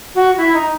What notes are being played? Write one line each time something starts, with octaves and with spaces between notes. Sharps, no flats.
F#4
E4
D#4